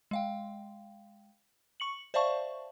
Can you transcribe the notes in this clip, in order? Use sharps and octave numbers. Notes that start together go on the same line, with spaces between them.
G#3 F5 G5
C#6 C#7 F#7
C5 D5 E5 F5 A5 C#6